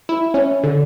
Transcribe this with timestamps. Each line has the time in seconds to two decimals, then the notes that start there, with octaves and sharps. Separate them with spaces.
0.09 E4
0.34 C#4
0.63 D3